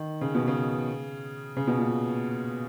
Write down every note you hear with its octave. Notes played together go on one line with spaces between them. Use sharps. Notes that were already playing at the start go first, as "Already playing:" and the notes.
Already playing: D#3
C#3
B2
C#3
C#3
B2
A#2